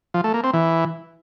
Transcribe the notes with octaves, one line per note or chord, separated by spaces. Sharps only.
F3
A3
A#3
C4
E3